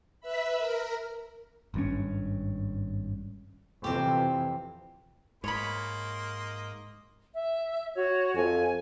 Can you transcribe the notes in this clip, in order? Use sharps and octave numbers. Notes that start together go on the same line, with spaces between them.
B4 E5 B5
A#4
G#1 G2 C#4
F2 C3 E3 C4 G4
G#2 A#3 C#5 D#5 B5 C6
E5
F#4 C#5
F2 G#5